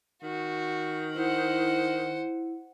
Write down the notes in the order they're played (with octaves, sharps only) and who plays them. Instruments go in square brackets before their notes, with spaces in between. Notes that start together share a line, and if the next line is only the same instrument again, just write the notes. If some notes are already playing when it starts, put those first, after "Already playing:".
[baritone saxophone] D#3 [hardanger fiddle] F#4
[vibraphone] E4 [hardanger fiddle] C5 F#5